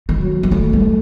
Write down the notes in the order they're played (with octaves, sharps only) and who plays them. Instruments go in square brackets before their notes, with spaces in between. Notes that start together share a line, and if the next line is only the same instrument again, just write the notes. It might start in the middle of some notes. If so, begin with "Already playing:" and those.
[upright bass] D#3
[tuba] F#3
[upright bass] D#3
[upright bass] F#3 [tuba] A3
[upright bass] G3